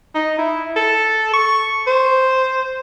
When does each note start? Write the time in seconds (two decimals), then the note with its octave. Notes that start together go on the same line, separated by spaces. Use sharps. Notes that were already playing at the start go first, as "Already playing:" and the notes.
0.15 D#4
0.38 E4
0.76 A4
1.34 C#6
1.87 C5